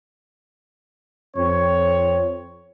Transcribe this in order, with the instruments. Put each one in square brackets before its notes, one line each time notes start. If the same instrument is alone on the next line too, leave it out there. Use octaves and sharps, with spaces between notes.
[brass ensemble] F2 C4 C#5